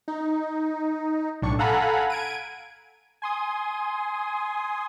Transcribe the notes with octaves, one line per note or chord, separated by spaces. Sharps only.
D#4
B1 A2 D4 C#6
A4 F5 F#5 G#5 A#5 B5
G#6 D7 D#7
G#5 C6 D#6